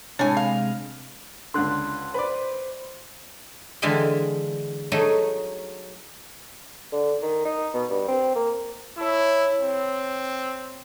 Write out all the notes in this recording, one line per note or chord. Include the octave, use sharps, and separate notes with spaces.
A2 C3 G#3 D4 C#5 G#5
F5
C#2 D3 C6 F#6
B4 C5 D5
D3 E3 G#3 F4 E5 G5
F#3 A3 D#4 G#4
D3
D#3
D#4
B2
G2
C4
A#3
E4 C#5 A5 E6
C4